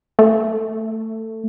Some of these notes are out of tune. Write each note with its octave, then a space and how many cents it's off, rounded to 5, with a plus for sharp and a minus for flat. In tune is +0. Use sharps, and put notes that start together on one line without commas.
A3 +15